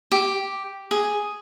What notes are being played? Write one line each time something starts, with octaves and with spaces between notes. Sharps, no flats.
G4
G#4